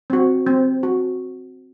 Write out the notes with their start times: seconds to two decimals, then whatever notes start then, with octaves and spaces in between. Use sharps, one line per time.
0.10 C4 F#4
0.47 C4
0.83 F#4